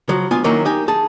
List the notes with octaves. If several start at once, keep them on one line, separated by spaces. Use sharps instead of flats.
C#3 F3 F#3
D2 B3 F4 G#5
D#3 F#3 A#3 C#4 D#4 E4
D#4 G4 G#5
G#4 A5